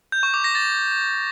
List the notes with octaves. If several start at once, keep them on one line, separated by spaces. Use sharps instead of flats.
G6
C#6
D6
A#6
A6